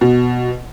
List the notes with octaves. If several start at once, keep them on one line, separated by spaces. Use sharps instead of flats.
B2